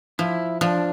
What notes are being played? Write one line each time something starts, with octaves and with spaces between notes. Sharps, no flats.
F3 E4
F3 D4